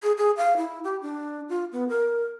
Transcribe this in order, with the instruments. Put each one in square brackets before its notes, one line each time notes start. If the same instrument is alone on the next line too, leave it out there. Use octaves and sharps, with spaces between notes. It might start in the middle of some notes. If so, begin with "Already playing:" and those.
[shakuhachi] G#4
G#4
F5
E4
G4
D4
F4
B3
A#4